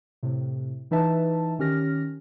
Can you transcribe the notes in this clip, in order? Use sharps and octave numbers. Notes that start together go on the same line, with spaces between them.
A2 C3
E3 D#4 B4 E5 A5
D#3 C#4 G4 F6 A#6